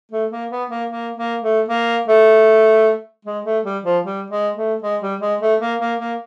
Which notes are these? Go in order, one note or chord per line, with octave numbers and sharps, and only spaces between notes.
A3
A#3
B3
A#3
A#3
A#3
A3
A#3
A3
G#3
A3
G3
F3
G3
G#3
A3
G#3
G3
G#3
A3
A#3
A#3
A#3